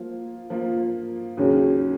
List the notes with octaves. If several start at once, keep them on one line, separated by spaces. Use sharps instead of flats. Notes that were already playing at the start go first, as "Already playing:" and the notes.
Already playing: F3 A#3 F4
F3 A#3 F4
D#2 C#3 F#3 C#4